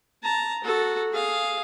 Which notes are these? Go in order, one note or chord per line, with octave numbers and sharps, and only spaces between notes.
A5 A#5
F#4 A4
G#4 F5